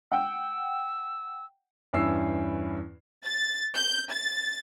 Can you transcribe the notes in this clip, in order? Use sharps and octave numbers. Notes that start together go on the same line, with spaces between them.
F#5 G5 E6
E2 G2 C#4 E4 E6 C7
A6
G6
A6